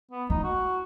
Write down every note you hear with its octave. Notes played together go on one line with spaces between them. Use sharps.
B3
D#4 E4
F#4